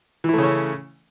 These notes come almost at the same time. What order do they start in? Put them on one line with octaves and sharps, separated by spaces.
E3 E4 A3 C#3 C#4